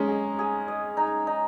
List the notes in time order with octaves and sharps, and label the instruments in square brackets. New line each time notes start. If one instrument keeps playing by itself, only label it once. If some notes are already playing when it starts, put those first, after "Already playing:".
Already playing: [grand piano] G#3 C#4 [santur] D#4
[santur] G#4
G#4
D#5
D#4
D#4